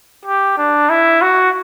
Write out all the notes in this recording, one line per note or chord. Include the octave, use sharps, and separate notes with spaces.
G4
D4
E4
F#4